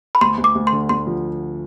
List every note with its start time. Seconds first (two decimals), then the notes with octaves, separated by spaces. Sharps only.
0.15 B5
0.21 D2 C6
0.38 D2
0.44 D6
0.55 D2
0.67 C6
0.72 D3
0.89 D2 C6
1.07 F3